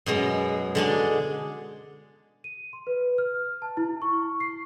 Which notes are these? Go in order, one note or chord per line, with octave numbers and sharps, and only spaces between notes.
F#2 B2 G#3
D3 G#3 D4
D#7
C6
B4
F6
A5
E4
C#6
C7